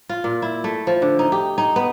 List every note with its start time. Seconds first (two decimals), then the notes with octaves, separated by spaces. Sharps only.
0.09 F4
0.24 A#2
0.42 E4
0.64 A3
0.87 F3
1.02 D3
1.19 D#4
1.32 G4
1.58 D#4
1.76 B3